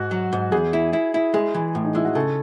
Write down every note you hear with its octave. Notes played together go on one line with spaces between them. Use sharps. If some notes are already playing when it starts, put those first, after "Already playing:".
Already playing: G#2 F#4
F#3
G#2
E2 G#4
E4
E4
E4
G#3 G#4
E3
A2
D#4
G#3 E4
F#4
C#3 A4